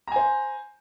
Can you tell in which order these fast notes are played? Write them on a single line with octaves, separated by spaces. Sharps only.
A#5 G#5 C5